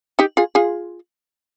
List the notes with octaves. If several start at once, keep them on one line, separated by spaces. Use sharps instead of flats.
D#4 G4
F4 G#4
F4 G#4